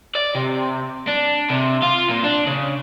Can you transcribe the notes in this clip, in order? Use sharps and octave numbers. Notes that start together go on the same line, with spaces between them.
D5
C3
D4
C3
F4
A#2
D4
C#3